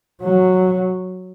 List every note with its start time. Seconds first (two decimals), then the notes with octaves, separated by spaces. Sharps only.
0.23 F#3